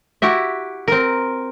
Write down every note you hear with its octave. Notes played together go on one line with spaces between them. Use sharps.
E4 F#4 G4 E5
C4 A#4